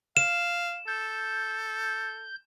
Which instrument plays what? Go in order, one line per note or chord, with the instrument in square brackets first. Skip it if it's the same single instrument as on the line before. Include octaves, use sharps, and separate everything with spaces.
[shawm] F5 [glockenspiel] E7
[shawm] A4 [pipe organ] G6